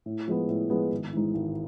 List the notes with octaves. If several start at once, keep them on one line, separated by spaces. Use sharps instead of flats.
A2
F3 G#3 B3
A2
F3 G#3 B3
G#1
G#2 E3
G#1